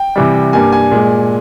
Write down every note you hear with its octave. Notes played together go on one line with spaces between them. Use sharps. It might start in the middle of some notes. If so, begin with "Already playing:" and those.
Already playing: G5
C3 E3 G3
G2 G3 A#3 G#5
G#5
A#2 G#3